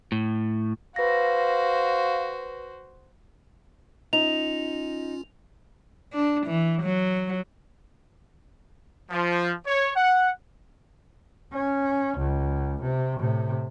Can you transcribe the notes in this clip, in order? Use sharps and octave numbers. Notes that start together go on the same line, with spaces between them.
A2
F#4 B4 C5 F5 A#6
C#4 D#4 F4 F7
D4
E3
F#3
F3
C#5
F#5
C#4
C#2
C3
A2 C3